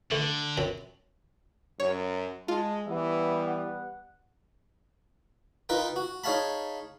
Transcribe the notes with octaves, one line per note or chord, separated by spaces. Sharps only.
D3 A3
F#2 B5
F#2 C#5
G#3 F4 A5
E3 G3 B3 E5
F#5
D#4 F4 A#4 B4 G5
F#4
D#4 G#4 C#5 F5 A5 B5